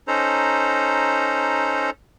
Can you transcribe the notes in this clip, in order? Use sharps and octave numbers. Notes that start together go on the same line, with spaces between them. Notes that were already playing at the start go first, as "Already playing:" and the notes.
C#4 D#4 A4 C5 A#5